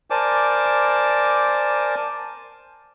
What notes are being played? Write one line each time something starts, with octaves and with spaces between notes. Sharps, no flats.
A#4 C5 D5 G#5 A5 D6